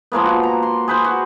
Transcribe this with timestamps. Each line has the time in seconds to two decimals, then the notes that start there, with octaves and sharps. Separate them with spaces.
0.12 F3 G#3 A#3 B3
0.26 F#4
0.43 A#5
0.63 C6
0.88 G#4 B4 C5
1.04 F#4